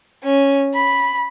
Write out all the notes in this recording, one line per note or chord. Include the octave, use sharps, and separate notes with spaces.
C#4
B5